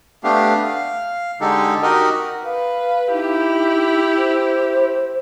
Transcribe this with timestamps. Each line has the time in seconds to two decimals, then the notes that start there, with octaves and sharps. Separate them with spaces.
0.24 A3 B3 D4 G4 F5
0.64 F5
1.41 D3 G#3 D#4 G4 A4
1.83 D#4 F#4 G4 A#4 D#5
2.45 B4 F5
3.13 D#4 E4 G4
4.18 C5